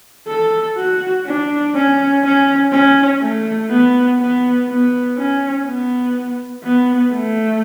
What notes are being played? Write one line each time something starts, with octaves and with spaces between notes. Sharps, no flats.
A4
F#4
D4
C#4
C#4
C#4
A3
B3
B3
B3
C#4
B3
B3
A3